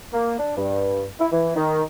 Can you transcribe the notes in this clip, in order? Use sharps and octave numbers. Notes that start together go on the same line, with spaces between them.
A#3
D4
G2
E4
E3
D#3